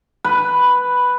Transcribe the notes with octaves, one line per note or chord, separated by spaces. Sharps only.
B4